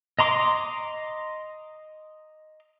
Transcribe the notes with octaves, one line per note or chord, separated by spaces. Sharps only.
D#5 A#5 C6 D6